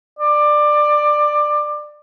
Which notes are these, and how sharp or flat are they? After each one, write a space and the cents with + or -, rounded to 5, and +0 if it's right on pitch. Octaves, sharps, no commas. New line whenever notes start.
D5 +20